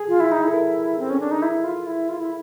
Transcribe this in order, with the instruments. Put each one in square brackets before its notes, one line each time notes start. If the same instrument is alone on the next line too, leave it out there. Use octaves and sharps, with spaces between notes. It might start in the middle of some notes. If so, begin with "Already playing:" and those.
Already playing: [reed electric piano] G#4
[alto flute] F4
E4
D#4
[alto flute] E4 [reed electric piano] A4
[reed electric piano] A#4
[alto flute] C4
C#4
D4
D#4
E4
F4
E4
F4
E4